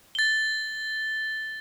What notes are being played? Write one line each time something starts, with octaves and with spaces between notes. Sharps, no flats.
A6 G7